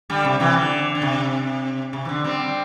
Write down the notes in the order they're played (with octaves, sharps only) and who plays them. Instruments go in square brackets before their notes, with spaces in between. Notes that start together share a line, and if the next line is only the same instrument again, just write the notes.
[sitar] D3 G3
C3
C3 E3
D3
D3
C3
C3
E3
D3
G3 C4